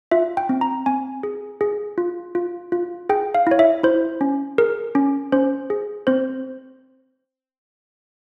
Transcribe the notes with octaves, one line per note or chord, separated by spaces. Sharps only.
F4 E5
G5
C4
A#5
C4 G#5
G#4
G#4
F4
F4
F4
G#4 G5
F5
E4 C#5
E5
E4 C5
C#4
G#4 A#4
C#4
C#4 C5
G#4
C4 C5